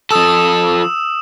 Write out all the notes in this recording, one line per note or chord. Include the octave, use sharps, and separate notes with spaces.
F3 A4 D#6 E6 E7